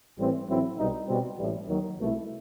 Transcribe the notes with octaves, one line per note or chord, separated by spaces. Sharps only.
A1 A2 E3 G3 C4
A1 A2 F#3 C4 E4
C2 B2 G3 D#4
B2 G3 C4
A1 A2 E3 G3
D#2 D#3 F#3
C2 B2 A3 E4